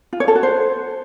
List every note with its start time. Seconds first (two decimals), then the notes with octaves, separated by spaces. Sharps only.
0.13 F4
0.20 C#5
0.28 A4
0.35 F#4
0.43 C5